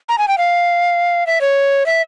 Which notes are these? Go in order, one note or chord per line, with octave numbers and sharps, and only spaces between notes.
A#5
G#5
G5
F5
E5
C#5
E5